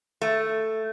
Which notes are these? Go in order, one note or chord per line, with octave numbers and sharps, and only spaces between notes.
A3